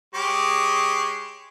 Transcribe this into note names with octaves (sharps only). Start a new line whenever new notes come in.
G#3 G4 C#5